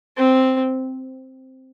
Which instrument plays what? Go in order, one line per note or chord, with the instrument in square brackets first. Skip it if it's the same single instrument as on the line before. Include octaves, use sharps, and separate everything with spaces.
[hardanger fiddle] C4